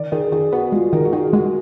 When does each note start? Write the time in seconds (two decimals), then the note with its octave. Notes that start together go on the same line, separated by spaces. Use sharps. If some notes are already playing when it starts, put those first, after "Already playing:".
Already playing: D#3 D5
0.12 D#3 G#4
0.32 D#3 G#4
0.52 B3 F#4
0.72 G#3 F4
0.93 D#3 A#4
1.05 F#4
1.13 D#3 G#4
1.33 G#3 F#4